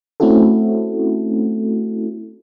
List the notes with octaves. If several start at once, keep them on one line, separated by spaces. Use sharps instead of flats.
A3 C4 C#4 E4 F#4 A4